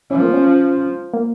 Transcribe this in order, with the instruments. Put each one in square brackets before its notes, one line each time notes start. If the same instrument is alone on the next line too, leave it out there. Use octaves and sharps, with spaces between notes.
[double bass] F3 [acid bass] C#4
[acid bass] A#3
C#4
A#3